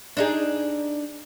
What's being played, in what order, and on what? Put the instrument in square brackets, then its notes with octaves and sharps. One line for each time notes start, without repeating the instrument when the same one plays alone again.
[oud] D4 D#4 G#4